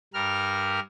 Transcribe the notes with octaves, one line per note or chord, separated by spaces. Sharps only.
G2 G3 A#4 F6